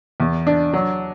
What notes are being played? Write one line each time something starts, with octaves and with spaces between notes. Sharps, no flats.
E2
D4
F#3